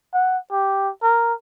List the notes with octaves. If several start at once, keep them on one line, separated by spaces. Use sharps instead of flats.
F#5
G4
A#4